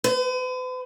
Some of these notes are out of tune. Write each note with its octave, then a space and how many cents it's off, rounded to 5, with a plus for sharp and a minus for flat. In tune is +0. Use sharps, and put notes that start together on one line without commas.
B4 +45